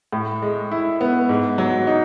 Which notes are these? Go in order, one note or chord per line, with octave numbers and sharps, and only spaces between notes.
A2
G#3
E4
B3
G#2
F#3
D#4